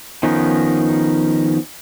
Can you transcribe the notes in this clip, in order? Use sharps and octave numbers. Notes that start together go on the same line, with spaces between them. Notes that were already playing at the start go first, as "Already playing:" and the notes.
D#3 F3 B3 C#4 D#4